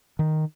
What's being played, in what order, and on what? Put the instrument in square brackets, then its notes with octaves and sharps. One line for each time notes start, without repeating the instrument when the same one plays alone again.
[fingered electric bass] D#3